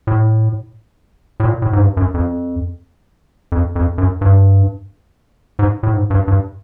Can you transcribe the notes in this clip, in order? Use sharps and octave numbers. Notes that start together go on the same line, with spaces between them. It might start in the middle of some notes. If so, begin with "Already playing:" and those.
A2
A2
A#2
A2
G#2
G2
F#2
F2
F2
F2
F#2
G2
G#2
A2
G#2
G2
G2